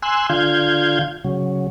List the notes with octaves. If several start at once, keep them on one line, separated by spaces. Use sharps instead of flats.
G#5 C6 E6 F#6
D3 F4 F5 G6 G#6
C#3 F#3